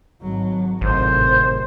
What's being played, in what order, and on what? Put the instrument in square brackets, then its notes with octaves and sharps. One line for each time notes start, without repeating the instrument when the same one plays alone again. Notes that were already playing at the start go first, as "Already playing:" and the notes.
[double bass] G#1 F#3
[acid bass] G#1 [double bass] A2 C3 [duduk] C5